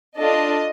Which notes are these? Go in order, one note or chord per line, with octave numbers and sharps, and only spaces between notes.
D4 F4 A4 D#5